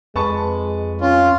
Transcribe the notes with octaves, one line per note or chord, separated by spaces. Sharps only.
F2 G#3 B4 A5 C#6
C#4 F4